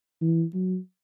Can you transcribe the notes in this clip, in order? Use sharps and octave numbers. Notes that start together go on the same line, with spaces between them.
E3
F#3